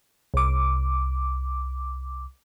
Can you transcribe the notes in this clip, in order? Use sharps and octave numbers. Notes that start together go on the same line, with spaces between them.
C2 D6